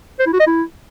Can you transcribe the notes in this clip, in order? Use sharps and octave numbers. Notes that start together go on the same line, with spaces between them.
C5
E4
F#4
D#5
E4